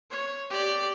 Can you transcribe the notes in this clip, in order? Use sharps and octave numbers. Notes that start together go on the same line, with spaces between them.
C#5
G4 D5